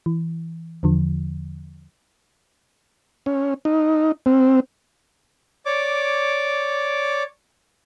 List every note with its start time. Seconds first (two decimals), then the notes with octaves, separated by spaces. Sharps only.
0.06 E3
0.83 E2 D3 F3
3.26 C#4
3.65 D#4
4.26 C4
5.66 C#5 D5 D6